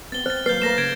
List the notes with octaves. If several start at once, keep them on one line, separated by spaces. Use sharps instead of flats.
B3 C4 A6 G7
C4 C5 F6 A6
F#3 A#3 B4 G6 A6 C7
A3 A#3 A#4 A#6 E7
C#3 G#6 D7 E7